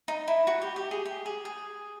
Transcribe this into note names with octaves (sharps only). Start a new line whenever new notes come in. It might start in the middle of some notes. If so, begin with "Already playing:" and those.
D#4
E4
F#4
G4
G4
G#4
G4
G#4
G#4